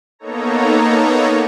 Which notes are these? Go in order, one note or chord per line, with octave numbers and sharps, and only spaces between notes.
A#3 B3 D#4 A4 C#5 A#5